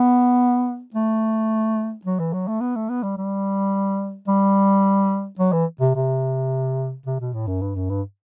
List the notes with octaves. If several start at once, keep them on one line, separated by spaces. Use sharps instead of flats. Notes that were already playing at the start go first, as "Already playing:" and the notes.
Already playing: B3
A3
F#3
E3
F#3
A3
B3
A3
B3
G3
G3
G3
F#3
E3
C3
C3
C3
B2
A2
F#2
G2
F#2
G2